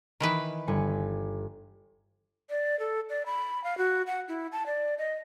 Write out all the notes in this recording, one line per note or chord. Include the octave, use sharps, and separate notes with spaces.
D#3 E3 B4 D#5
G1 G#5 C#7
D5
A4
D5
B5
F5
F#4
F#5
E4
A5
D5
D#5